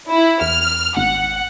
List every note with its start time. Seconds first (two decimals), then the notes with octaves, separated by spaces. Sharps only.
0.10 E4
0.41 E2 F6
0.97 G#1 F#5